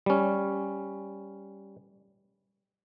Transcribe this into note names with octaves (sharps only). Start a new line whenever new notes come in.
G3 C#4